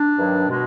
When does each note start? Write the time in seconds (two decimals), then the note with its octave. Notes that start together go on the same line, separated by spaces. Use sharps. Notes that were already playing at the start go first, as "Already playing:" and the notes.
Already playing: D4
0.17 G2 D#3 F#3
0.47 B2 G#3